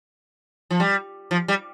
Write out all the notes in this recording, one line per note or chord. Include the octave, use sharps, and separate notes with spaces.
F3
G3
F3
G3